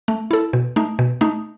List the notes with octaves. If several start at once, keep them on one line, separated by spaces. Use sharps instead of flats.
A3
E4 A4
B2
A3 D#4
B2
A3 D#4